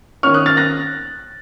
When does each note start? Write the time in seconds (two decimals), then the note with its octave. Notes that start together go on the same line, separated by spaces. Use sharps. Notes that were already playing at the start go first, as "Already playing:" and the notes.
0.23 D#3 A#3 C#4 C#6 F6
0.34 D#6 F#6
0.46 F6 A6
0.57 F#6 A#6